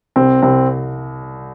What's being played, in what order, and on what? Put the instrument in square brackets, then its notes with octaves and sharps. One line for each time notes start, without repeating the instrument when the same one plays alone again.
[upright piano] C2 [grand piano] C4
[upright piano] C2 [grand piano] C4